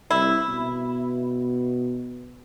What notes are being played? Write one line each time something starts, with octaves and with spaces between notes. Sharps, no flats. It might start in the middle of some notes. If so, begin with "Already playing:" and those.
C2 E4
B2